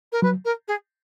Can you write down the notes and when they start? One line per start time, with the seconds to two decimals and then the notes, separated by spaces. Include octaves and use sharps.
0.12 A#4
0.22 F#3 B4
0.44 A#4
0.67 G#4